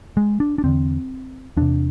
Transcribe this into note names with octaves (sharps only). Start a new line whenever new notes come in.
G#3
D4
D4
E2 D3 C4
E2 C3 D4